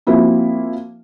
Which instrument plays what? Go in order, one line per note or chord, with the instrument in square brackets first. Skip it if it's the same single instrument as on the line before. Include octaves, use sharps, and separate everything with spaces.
[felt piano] F3 A#3 C4 E4 F#4